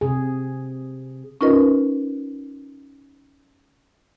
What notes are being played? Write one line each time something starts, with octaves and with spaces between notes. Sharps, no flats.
C3 G#4
C#4 D#4 F4 A#4 B4 D#5